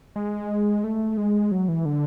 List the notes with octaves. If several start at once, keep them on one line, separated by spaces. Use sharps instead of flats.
G#3
A3
G#3
F#3
E3
D3